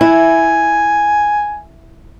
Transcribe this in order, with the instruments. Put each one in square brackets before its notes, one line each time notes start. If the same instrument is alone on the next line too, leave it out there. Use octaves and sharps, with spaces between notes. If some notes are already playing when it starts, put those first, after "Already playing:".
[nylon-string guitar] E4 [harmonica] G#5